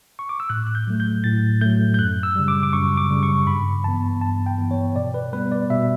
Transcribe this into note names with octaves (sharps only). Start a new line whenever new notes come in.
C#6
D6
E6
A2 F#6
F#6
G6
F#3 A3
G6
A2 A6
F#3 A3 G6
G6
F#2 F#6
E6
C#3 G3
D6
D6
F#2 C#6
D6
C#3 G3
C#6
G2 B5
E3 B3 A5
G2 A5
G5
E3 B3
C#5
B2 D5
B4
G3 B3 B4
D5
B2 E5